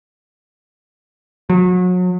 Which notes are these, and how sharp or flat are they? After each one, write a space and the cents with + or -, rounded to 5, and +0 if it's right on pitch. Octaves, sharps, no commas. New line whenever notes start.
F#3 -35